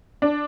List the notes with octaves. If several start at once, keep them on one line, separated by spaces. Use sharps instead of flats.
D4